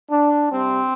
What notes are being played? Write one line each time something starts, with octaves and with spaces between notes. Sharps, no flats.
D4
C3 G3 C4